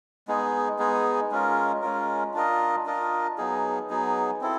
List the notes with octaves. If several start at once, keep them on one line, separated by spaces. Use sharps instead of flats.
G#3 B3 D#4 G#4
G#3 B3 D#4 G#4
G#3 C#4 F4 A#4
G#3 C#4 F4 A#4
D4 F4 A#4 D#5
D4 F4 A#4 D#5
F#3 B3 D#4 G#4
F#3 B3 D#4 G#4
C4 E4 A4